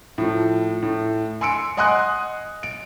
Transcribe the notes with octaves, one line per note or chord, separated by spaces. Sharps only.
A2 F3
A2
G#5 C6 E6 C#7 D7
D#5 F#5 G#5 C6 D#6 F#6
D7